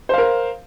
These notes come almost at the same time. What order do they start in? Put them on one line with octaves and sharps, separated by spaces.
C5 F5 A#4